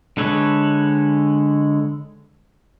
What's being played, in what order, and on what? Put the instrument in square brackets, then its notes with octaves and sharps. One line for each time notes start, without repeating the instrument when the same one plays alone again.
[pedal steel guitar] D3 G#3 A4 B4 C#5